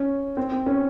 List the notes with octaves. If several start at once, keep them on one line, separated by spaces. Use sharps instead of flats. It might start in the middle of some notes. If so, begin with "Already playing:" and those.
Already playing: C#4
C4
C4
C#4